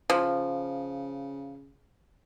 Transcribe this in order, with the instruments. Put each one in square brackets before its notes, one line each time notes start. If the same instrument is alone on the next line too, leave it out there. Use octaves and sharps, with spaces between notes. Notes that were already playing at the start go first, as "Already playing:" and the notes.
[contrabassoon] C#3 [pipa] F3